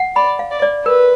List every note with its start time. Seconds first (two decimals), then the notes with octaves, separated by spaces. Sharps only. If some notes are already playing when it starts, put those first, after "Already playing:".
Already playing: F#5
0.16 D5 B5
0.39 F5
0.51 D5
0.62 D5
0.85 A#4 B4